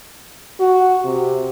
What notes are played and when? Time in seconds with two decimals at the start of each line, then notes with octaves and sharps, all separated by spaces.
0.60 F#4
1.05 C3